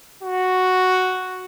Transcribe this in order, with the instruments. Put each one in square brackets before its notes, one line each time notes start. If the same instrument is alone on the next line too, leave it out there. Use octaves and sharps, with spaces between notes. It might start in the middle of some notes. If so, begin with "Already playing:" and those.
[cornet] F#4